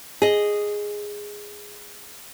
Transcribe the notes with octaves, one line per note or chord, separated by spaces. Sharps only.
G#4 D#5